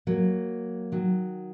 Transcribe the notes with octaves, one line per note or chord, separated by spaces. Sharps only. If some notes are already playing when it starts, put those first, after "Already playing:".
F#3 A#3
D#3 F#3